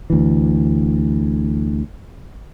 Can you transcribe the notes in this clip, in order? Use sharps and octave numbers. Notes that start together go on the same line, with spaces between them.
D2 E3